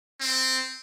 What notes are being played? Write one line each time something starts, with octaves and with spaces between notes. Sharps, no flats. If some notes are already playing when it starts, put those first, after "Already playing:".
C4